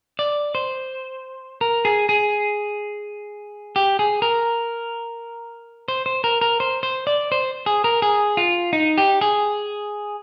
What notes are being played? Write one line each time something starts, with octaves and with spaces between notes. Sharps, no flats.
D5
C5
A#4
G#4
G#4
G4
G#4
A#4
C5
C5
A#4
A#4
C5
C5
D5
C5
G#4
A#4
G#4
F4
D#4
G4
G#4